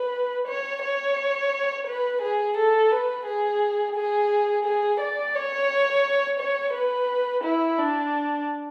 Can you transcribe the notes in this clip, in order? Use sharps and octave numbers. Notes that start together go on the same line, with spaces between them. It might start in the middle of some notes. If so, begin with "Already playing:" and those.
Already playing: B4
C#5
C#5
B4
G#4
A4
B4
G#4
G#4
G#4
D5
C#5
C#5
B4
E4
D4